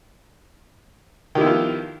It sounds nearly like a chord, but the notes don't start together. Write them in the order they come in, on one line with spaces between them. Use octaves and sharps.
D#3 G4 E4 B3 F3